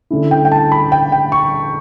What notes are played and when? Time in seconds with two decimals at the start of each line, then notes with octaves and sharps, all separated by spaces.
0.10 D3 A3 C#4 E4
0.31 G5
0.45 G5
0.52 A5
0.72 B5
0.92 G5
1.12 G5
1.32 C#6